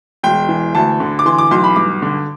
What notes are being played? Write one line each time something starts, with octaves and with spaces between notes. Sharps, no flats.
E1 G5
E3
D2 A5
D3
D6
E3 C6
D6
B1 C6
B5
G2 D6
D3